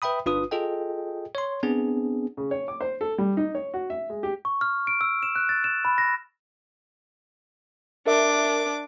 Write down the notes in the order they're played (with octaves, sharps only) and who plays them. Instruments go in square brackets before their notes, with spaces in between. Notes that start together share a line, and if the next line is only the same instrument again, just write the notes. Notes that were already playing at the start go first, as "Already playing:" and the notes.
[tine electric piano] B4 E5 G5 B5 D#6
G1 D4 F4 B4 D#6
F4 G#4 A4 D#5 G5
C#5 C6
B3 C4 D4 G#4
[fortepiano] C#3
C#5
D6
C5
A4
G3
D#4
C#5
F#4
E5
G#3
G4
[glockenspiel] C#6
F6
D7
E6
E7
F#6
A6
E7
B5
A#6
[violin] D4 D6 [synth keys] A#4 E5